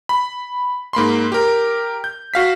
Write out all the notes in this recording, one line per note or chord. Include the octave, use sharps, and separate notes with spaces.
B5
G#2 A#3 B5 C6
G4 A#4
G6
F#4 F5 B6